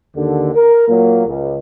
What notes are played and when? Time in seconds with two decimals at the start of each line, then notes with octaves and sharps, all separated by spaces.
0.16 D#2 D3
0.55 A#4
0.88 A#2 F#3 A#3
1.26 C#2